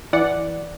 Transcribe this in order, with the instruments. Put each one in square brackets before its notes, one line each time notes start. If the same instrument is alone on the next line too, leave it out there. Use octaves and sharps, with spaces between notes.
[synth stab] E3 D5 F#5